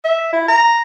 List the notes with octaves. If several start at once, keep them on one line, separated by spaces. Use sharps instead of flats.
E5
E4
A#5